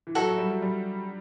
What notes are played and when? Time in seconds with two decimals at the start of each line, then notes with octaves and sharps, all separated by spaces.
0.07 E3
0.15 F#3 F#4 A4 E5
0.27 F#3
0.38 G3
0.50 F#3
0.62 G3